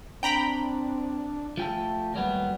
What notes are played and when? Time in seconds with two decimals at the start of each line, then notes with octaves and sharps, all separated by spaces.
0.23 C4 D4 G5 A#5 B5
1.57 F3 A3 G4 A4
2.14 D#2 F#3 G3 B3